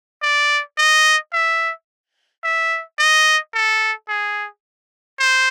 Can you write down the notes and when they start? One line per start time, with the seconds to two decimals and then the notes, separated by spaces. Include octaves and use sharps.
0.22 D5
0.78 D#5
1.33 E5
2.43 E5
2.99 D#5
3.54 A4
4.09 G#4
5.19 C5